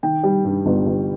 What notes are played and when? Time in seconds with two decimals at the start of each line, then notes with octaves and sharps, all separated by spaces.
0.03 D#3 G5
0.23 G3
0.45 G2
0.66 G1
0.86 G1